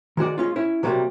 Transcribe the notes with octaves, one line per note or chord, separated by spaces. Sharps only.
D#3 G#3 F#4 D5
G#3 C#4 F4
C#4 E4
C3 F#3 G3 A3 A#3